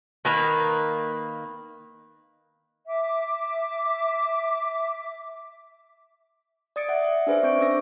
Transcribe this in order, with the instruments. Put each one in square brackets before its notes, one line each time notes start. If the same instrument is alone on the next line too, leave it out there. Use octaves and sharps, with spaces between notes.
[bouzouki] D#3 A#3 B4 A#5
[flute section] E5 D6
[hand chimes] D5 D#6 A6 C#7 D7
E5 F#5
E5
D4 G#4 B4 C5 D5 E5
C4 C#6 G6 D7
C#4 C5 D6 E6 A#6